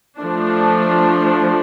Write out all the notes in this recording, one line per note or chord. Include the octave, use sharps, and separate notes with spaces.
F3 A3 D4